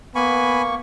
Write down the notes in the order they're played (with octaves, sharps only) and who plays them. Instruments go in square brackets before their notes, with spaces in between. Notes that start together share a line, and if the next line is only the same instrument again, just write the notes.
[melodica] A#3 C#6 [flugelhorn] B3 [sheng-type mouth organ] G#5 B5